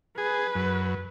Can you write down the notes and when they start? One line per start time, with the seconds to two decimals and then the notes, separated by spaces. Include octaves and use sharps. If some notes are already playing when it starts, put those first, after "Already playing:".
0.18 G#4 B4
0.55 F#2